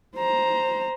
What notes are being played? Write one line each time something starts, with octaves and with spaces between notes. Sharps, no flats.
C5 A#5